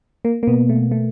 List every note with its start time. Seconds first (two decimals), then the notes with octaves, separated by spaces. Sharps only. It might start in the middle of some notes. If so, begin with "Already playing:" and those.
0.25 A#3
0.43 A#3
0.47 B2 B3
0.69 A3
0.91 A3